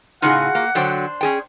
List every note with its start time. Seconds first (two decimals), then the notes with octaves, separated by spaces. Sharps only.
0.22 A2 C#3 D#4 F4 F#4 G#4 F#5
0.55 A#3
0.75 D3 F#3 D4 C5 G5
1.21 C#4 G#4 G5